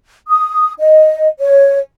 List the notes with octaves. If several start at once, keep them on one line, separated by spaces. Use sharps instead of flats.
D#6
D#5
C#5